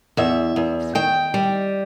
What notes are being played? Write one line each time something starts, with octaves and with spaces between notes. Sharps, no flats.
E2 E5
E2
D#3 G5
G3